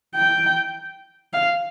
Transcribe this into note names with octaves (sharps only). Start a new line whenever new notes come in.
G5
F5